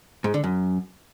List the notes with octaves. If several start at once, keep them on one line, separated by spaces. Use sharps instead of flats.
G#2
D3
F#2